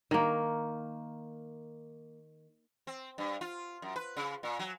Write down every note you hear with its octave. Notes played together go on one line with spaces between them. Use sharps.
D#3 A#3
C4
G2
F4
F#2
B4
C#3
A#2
F#3